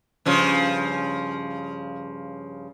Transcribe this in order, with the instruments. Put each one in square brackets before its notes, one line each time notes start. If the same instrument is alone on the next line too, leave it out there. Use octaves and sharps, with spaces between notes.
[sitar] G2 C#3 F3